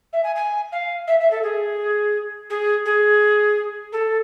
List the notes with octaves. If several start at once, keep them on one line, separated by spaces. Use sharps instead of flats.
E5
G#5
G#5
F5
E5
E5
A4
G#4
G#4
G#4
A4